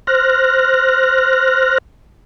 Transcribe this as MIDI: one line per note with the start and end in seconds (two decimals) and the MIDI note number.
0.07 1.78 72
0.07 1.78 89
0.07 1.78 90
0.07 1.78 94